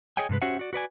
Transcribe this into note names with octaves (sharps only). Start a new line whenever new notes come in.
G#4 C#5 D#5 G5 G#5
G2 C3 G#3 B4
C#4 F#4 G4 C5 E5 F#5
F#4 D5
F#4 B4 D5 G#5